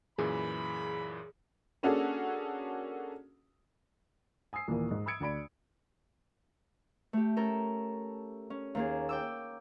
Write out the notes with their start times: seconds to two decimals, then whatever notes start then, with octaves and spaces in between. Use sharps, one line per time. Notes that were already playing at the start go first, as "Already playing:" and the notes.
0.18 F#2 A#2 E3 G#4 B5
1.83 A#3 C#4 D4 F#4 G#4 A4
4.53 G#5 D#6 E6 C7
4.68 D#2 A#2 E3 A#3
4.91 G#2
5.06 B5 D#6 E6 G#6 C#7 D7
5.20 D2 D5 B5 D7
7.13 A3 G4
7.36 C#4 A4 A#4
8.50 C#4
8.75 D#2 A#3 G#4
9.09 G5 D6 E6